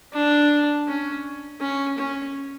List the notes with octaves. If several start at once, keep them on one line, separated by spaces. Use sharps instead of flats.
D4
C#4
C#4
C#4